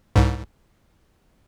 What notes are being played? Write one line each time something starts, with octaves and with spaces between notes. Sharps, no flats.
C2 G#2